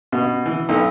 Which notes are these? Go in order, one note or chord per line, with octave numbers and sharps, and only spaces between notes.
B2
E3
B1